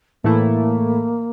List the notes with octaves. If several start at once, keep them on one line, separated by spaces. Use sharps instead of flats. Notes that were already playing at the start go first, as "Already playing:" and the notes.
A2 E3 A3 A#3 E4